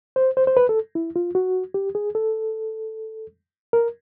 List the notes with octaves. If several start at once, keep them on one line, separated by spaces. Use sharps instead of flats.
C5
C5
C5
B4
A4
E4
F4
F#4
G4
G#4
A4
A#4